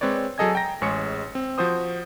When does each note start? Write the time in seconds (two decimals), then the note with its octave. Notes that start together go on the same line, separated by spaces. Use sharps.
0.01 G#3 C4 B4 C#5 D5
0.38 F#3 G#4 A4 D#5 G#5 G#6
0.55 G5 A#5 A#6
0.82 A1 G#3 G#4 C#5 C#6 C#7
1.35 C4
1.58 F3 F#4 C5 D#6